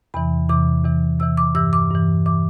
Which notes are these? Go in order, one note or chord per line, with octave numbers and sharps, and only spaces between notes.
E2 C3 E3 B5
E2 C3 E3 D6
E2 C3 E3
E2 C3 E3 E6
D6
G2 E3 E6
D6
G2 E3
E3 D6